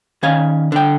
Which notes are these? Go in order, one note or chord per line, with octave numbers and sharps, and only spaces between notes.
D#3 C#4 F5 G#5
D3 G5